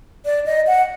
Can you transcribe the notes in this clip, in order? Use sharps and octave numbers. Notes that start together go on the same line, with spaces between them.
D5
D#5
F#5